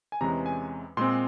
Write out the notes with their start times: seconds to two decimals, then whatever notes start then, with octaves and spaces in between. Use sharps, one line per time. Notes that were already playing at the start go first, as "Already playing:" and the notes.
0.12 G#5
0.21 E2 C3 E3 G#3 C#4 A#5
0.46 G#5
0.97 A#2 G#3 C4 C6